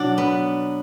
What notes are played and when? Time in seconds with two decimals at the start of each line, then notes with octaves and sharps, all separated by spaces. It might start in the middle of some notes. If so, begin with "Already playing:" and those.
Already playing: B2 F#3 D4 F#4 D5 F#5
0.18 B3 B4